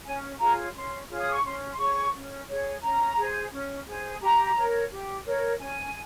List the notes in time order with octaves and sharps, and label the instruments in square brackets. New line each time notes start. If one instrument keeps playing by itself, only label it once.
[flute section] C#4 G#5
F4 G#4 C#5 A#5
C#4 C6
F4 G#4 C#5
D#6
C#6
C#4 C6
C6
G#4 C#5 C#6
C#4
G#4 C#5
C#4 A#5
G#4 C5
C#4
G#4 C5
G4 A#5
A#4 C#5
G4
A#4 C#5
C#4 G#5